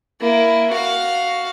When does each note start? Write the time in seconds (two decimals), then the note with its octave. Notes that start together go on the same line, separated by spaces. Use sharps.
0.21 A#3 E4
0.71 F#4 F5